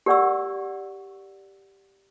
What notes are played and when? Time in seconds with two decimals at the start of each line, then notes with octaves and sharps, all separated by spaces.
0.06 G4 A#4 D5 F#5 C#6 E6